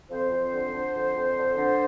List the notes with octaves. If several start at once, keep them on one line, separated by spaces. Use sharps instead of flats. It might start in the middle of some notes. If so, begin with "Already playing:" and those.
F2 C5
F2
D3
D3
F2
F2
D3
D3